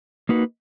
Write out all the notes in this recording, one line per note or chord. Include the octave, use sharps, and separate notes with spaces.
A#3 D#4 F#4 B4